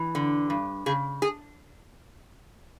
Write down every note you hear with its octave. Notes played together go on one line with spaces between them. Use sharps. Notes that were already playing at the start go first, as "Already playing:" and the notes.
Already playing: E3
D3
G2
C#3 G#4
G#4